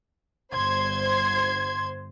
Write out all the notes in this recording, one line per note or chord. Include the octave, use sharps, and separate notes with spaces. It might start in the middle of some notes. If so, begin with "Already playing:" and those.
G1 C5 C6 G#6